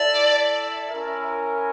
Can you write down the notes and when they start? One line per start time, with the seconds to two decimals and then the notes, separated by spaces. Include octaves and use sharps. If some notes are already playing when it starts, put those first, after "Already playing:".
Already playing: E4 A4 D5 E5
0.90 C#4 E4 A#4